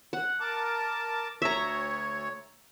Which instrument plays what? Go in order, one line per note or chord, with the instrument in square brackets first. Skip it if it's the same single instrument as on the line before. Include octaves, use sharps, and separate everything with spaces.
[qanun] F#5
[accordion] A#4 A5 D6
[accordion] D2 C#5 [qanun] E5 A#5